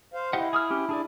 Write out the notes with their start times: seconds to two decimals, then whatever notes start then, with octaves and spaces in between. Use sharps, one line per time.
0.14 C5 F5
0.33 E4 G4 D#5 F#5
0.53 G#4 D#6 F6
0.71 C#4 G4
0.89 D4 G#4 D5